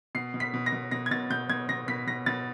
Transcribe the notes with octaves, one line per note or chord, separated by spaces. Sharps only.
B2 C7
B2
B6
B2
A#6
B2
B2 A#6
G#6
B2 A6
B2 G6
B2 G#6
B2 A#6
B2 B6
B2 A#6
B2 A6